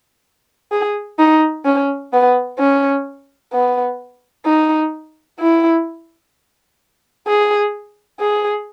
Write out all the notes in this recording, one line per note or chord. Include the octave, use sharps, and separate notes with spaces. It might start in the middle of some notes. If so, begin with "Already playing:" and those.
G#4
D#4
C#4
B3
C#4
B3
D#4
E4
G#4
G#4